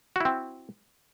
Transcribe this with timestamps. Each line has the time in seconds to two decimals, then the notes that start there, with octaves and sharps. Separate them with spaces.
0.16 F#4
0.20 E4
0.25 C4